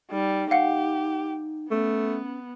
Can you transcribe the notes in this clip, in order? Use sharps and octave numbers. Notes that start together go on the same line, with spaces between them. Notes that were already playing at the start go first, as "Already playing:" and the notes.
G3 D#4
G4 F5 F#5
A3 B3 C#4